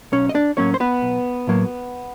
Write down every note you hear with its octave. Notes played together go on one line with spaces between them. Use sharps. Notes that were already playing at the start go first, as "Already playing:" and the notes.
B1 C#4 C#5
D#5
D4 D5
A2 F#3 A#3 C#4 C#5
C5
B3 B4
B1
A2 F#3 A#3